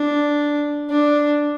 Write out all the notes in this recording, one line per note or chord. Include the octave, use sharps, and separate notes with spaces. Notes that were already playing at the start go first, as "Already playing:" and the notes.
Already playing: D4
D4